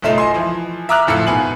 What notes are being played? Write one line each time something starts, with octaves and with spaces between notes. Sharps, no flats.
F#1 B1 A3 D#4 F4 E7
D#5 G#5 C6
E3 F3
E5 A#5 D6 D#6 F6 F#6
F#1 F2 A2 F4 E5 C#7
G#2 B2 B3 G#5 F#7